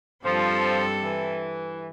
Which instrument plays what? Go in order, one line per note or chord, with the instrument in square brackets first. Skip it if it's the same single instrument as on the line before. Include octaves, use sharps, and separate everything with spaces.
[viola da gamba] G2 C4 A4 [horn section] F3
[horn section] E3